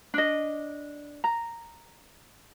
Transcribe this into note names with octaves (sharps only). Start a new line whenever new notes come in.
D4 D#5
A#5